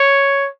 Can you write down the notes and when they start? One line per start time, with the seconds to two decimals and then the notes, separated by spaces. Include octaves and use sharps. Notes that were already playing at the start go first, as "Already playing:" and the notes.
Already playing: C#5